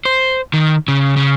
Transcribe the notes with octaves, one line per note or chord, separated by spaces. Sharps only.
C5
D#3
C#3
C#3